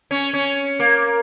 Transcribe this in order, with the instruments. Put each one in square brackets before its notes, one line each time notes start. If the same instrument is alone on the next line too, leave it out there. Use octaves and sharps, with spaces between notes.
[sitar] C#4
C#4
A#3